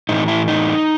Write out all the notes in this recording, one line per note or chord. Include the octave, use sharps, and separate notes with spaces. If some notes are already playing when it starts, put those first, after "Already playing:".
A2 E3 D#4
E4
D#4